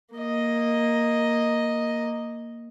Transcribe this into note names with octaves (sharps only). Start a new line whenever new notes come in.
A#3 D#5